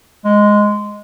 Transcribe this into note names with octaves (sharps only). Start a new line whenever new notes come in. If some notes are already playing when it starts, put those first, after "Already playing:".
G#3